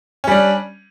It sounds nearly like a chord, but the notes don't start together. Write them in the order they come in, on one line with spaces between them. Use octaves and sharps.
C#4 G3 D4